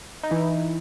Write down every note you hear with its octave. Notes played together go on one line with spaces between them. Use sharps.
D#4
E3 E4